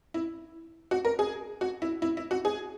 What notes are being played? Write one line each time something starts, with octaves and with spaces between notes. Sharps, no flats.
E4
F#4
A#4
G#4
F#4
E4
E4
E4
F#4
G#4